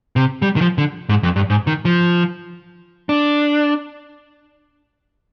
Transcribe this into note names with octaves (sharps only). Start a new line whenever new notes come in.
C3
G3
D#3
F3
D3
G#2
F2
G2
G#2
D#3
F3
D4